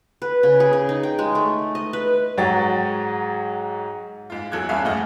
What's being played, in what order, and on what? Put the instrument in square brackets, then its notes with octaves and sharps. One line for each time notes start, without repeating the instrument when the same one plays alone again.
[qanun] B4
C#3
G#4
G#4
D#4
G5
G#3
A3
D#5
B4
[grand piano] G#2 F#3 C#5 G5 A6
[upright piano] G#2 F4
E2 F#3 A4 F#6 G#6
E2 G2 C#4 G#4 E5 F5
A#1 A2 A3 D#5 F#5 F6